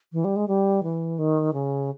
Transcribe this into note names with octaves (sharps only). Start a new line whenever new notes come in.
E3
G3
G#3
G3
E3
D#3
C#3